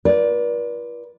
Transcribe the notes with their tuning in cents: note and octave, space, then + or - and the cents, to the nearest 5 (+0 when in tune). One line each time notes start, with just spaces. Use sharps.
F4 -45 B4 -45 D5 -5